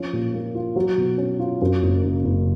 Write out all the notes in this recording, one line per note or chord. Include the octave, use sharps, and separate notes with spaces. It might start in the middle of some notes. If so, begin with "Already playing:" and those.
Already playing: F3 C#4
A#2
A#3
F4
F#3
B2
C#4
F4
F#2
F#1
C#3
F#1